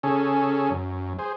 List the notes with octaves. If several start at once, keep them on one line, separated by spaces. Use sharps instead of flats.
C#3 C#4 G#4 A4
F#2
G#4 C5